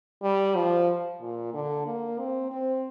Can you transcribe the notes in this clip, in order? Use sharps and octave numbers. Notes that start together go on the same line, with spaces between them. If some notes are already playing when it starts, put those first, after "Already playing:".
G3
F3
A#2
D3
A#3
C4
C4